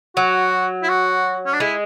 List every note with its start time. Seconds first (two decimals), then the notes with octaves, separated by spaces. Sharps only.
0.16 F#3 F#4
0.83 E4
0.89 F#4
1.46 C#4
1.53 D4
1.60 G#3 E4